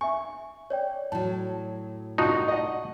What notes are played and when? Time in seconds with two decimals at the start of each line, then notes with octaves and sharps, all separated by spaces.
0.01 E5 G#5 C#6
0.70 C#5 D5 G5
1.12 A2 F#3 A5
2.18 C2 D#4 F4 F#4 A5 C#6 D#6
2.48 D#5 F#5